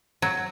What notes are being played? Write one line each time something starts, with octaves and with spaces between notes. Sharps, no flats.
F#3